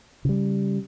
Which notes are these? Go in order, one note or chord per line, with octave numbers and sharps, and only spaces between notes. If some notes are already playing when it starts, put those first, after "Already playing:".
C#3 G3